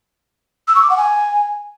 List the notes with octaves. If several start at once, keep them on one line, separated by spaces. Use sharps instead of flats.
E6
C#6
D6
F#5
G#5